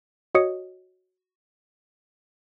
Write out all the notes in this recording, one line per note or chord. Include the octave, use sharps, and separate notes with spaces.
F#4 C#5 D#5 D#6 C#7